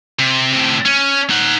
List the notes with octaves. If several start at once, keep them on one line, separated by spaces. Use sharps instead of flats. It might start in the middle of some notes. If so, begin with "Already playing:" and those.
C3
A2 C3
C#4
D#4 F#5